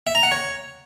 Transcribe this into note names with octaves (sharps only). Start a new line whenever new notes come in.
E5
A#5
F#5
C#5